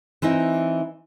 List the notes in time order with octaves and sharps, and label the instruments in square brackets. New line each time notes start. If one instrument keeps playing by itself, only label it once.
[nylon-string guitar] E3 C4 D#4 E4